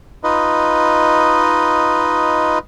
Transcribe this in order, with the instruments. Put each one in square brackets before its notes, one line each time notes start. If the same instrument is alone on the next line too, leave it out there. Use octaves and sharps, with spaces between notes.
[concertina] D#4 F4 B4 D#5